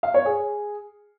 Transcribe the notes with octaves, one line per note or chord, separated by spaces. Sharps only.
F5
C#5
G#4